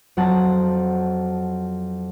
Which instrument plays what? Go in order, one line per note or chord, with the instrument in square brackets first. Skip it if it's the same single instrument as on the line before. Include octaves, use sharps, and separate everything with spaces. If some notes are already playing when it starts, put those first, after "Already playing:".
[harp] F2 F#3 C4 F#5 A5